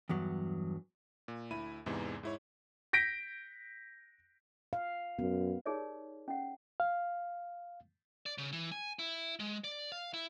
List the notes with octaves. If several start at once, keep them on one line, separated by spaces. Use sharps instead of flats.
E2 G2 F#3
A#2
D2 E4 B5 D#7
E2 G#2 C3 E3 D#4
G#2 E4 C#5
G6 A#6 B6 D7
F5
F#2 B3
D#4 G4 G#4 A#4 C#5 D5
C#4 F#5
F5
D5
C#3
E3
G#5
E4
G#3
D5
F5
E4